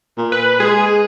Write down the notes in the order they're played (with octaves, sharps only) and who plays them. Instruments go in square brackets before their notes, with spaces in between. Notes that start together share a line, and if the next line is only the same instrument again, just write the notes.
[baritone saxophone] A#2
[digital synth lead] B4
[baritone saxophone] G#3 [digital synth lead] G#4